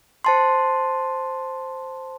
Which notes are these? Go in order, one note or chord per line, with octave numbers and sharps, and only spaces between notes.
C5 A5 C6